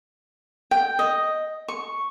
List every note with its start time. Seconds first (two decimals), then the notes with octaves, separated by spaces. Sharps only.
0.71 G5
0.99 D#5
1.68 C#6